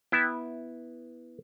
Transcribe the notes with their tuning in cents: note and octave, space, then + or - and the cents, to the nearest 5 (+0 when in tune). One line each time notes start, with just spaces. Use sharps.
B3 -5 E4 -5 G5 +0